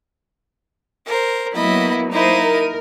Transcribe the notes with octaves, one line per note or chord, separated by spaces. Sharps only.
A#4 C5
F#3 A#3 B3 E4 D#5 B5
A#3 D#4 E4 C5 D#5 D#7
A#4